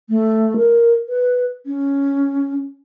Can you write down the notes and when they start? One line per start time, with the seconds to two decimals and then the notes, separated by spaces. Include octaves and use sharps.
0.10 A3
0.57 A#4
1.09 B4
1.66 C#4